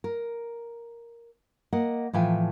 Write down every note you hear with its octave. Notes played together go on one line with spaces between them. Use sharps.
A#4
A#3 D#5 F#5
A2 E3 F3 G5 G#5